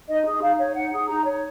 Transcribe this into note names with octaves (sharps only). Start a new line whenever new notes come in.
D#4 D#5
G#4
D#4 F5
C#5
D#4 F#5
G#4
D#4 A#5
C#5